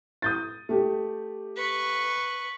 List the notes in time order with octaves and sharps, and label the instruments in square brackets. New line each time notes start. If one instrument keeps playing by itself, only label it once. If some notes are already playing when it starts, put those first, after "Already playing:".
[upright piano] D#6 G6 A6
A3 G4
[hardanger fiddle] B4 C#6